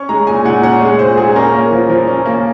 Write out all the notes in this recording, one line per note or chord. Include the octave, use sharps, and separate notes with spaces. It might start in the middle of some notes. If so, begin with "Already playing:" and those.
Already playing: C#4 C#6
G#3 A#5
A#2 G#5
A#2 F#5
C#4 F#5
G#3
A#2 C5
A#2 G#4
C#4 A#4
A#3
F3
F3
C#4
A#3